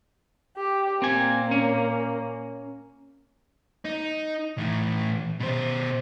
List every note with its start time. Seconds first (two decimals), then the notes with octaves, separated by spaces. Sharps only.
0.57 G4
1.02 A#2 A#3 C4 G#5
1.51 C#4
3.85 D#4
4.58 A2 E3
5.40 B2 C5